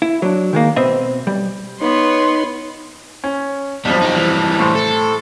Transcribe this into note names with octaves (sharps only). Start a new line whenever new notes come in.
E4
F#3 D4
D#3 G#3 A#3
B2 B3 C4 D#5 E5
B1 G3
B3 D#4 B4 C#5 C6
C#4
B1 F2 F3 G3
D#4 G4
E3 G3
A2 C5 A5
A4